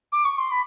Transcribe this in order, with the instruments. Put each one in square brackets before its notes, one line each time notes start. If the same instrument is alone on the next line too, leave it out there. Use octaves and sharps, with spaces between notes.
[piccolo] D6
C#6
C6
B5